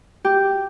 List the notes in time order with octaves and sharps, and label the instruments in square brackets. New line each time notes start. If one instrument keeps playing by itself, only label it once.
[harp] G4